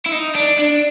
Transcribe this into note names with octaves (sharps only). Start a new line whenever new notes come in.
E4
D#4
D4
D4